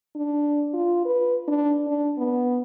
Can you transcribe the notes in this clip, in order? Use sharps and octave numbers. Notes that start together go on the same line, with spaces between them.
D4
F4
B4
D4
D4
B3